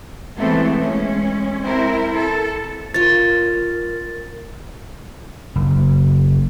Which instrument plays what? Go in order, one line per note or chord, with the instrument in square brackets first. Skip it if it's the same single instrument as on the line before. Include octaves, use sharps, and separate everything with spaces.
[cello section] E3 G#3 A3 B3 C4
G#3 C#4
C4 E4 A#4
A4
[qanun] F4 C#5 [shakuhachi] A#4 [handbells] A6
[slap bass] F#1